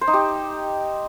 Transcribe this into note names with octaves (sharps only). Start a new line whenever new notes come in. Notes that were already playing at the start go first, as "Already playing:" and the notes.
C5
D#4
G4